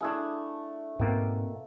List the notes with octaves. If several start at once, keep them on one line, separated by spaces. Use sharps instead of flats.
A3 D4 E4 G#4 F#5
G#2 B2 A#3 C4